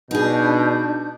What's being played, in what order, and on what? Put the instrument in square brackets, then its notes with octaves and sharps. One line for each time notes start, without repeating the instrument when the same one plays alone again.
[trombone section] B2 [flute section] D4 G6 [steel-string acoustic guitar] D#4 G#4